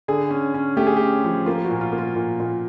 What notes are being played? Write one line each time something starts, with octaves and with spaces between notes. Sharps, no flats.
D3 G#4
C#4
C#4
A3 G4
G#4
C#4 G4
F3
A#3 F4
F#4
A#2
F4
A#3
F4
A#2
A#2